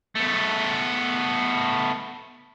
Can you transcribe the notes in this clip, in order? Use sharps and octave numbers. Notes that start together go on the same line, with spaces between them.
A3 B3